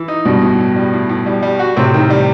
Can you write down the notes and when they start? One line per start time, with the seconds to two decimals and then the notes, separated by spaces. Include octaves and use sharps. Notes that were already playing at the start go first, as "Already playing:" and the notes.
Already playing: E3
0.08 D#4
0.25 G2 B2 G3
0.42 A2
0.59 A2
0.76 G3
0.93 A2
1.09 A2
1.26 G3
1.42 G3
1.59 F#4
1.76 A2 C3 C4
1.94 D#3
2.10 G3